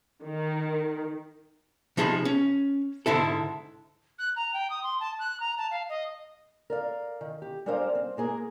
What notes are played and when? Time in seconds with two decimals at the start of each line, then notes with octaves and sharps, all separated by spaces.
0.24 D#3
1.97 C3 F3 D#4 G#4 A5 B5
2.25 C#4
3.06 G#2 D3 E4 A4
4.19 F#6
4.36 A#5
4.54 G5
4.70 D#6
4.84 C6
5.00 A5
5.19 F#6
5.40 A#5
5.58 A5
5.71 F5
5.89 D#5
6.70 A#4 D5 F5
7.21 D#3
7.42 G4
7.66 G3 G#3 D4 A#4 C5 F5
7.95 C4
8.17 G#3 A#3 G#4 A#4